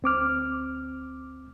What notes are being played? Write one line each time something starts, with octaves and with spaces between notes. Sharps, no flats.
D2 C4 D6 F6